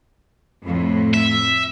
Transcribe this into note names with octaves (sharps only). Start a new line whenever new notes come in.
F2 A2
E5